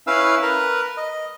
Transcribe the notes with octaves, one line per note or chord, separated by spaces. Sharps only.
C#4 E4 B4 F5 E6
A#4 B4
D#5